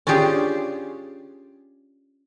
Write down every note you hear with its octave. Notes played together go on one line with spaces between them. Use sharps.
C#4 D4 F4 G4 G#4